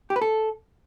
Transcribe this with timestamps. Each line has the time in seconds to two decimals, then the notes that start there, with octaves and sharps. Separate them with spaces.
0.10 G4
0.16 B4
0.22 A4